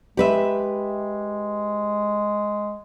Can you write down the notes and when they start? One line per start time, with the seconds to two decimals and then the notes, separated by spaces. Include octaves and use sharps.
0.17 G#3 G4 B4 E5